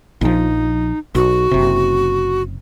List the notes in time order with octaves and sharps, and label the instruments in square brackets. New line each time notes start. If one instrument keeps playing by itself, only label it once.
[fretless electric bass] A#1 F3 [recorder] D#4
[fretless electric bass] B1 [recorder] F#4
[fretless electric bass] F#1 C3